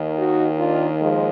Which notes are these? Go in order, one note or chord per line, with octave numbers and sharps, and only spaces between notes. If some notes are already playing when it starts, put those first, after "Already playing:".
Already playing: D#2 D#3
D#4 F#4
D4 F4
F3 G#3